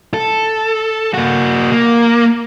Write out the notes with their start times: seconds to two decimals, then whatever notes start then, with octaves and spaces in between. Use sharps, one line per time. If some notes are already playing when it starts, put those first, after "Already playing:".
0.14 A4
1.14 A#3 F#4
1.72 A#3